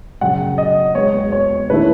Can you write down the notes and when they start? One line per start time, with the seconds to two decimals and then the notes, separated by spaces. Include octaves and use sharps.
0.21 F#2 C#3 F#3 F#5
0.58 D#5
0.95 E2 B2 G#3 B3 C#5
1.32 C#5
1.70 D#3 A3 C#4 E4 B4